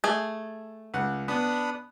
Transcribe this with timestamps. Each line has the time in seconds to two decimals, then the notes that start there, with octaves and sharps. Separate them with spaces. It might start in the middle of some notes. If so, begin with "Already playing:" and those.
0.04 A3 G#4
0.94 C#2 F#5
1.28 B3 D4 B5 D#6